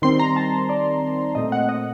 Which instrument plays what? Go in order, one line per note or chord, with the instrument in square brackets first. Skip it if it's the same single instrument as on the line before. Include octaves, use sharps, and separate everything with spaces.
[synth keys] D#3 G3 C4 C6
A#5
A5
D5
A#2 A3 C4 D#5
F#5
D#5